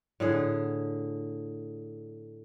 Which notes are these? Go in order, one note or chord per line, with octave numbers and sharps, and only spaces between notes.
A2 D3 G#4